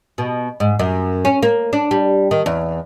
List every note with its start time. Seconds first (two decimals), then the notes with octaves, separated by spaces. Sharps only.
0.18 B2
0.60 G#2
0.79 F#2
1.25 C#4
1.43 A#3
1.73 D4
1.91 G3
2.31 D#3
2.46 E2